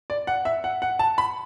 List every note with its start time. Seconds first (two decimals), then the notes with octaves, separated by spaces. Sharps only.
0.10 D5
0.27 F#5
0.45 E5
0.64 F#5
0.82 F#5
0.99 A5
1.18 B5